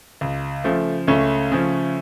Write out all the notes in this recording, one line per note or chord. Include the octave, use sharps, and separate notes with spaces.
C#2
C#3 F3 A3
C#2 A3 C#4
C#3 F3